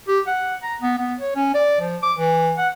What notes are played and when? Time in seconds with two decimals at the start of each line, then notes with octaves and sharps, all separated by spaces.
0.08 G4
0.27 F#5
0.63 A#5
0.81 B3
0.98 B3
1.20 C#5
1.36 C#4
1.54 D5
1.81 F3
2.03 D6
2.18 E3
2.58 F#5